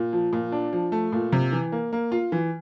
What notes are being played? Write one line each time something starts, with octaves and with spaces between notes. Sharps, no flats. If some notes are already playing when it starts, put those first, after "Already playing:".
Already playing: A#2
F3
A#2
D4
F3
A3
A#2
C3
E3
A#3
A#3
F4
E3